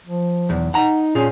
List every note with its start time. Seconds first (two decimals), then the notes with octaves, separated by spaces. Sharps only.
0.06 F3
0.49 B1 E2
0.74 D#4 F#5 A#5
1.15 A#2 C#4 F4 G#4